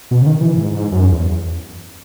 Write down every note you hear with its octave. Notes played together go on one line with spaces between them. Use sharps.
B2
C#3
D#3
E3
G#2
G#2
F#2
E2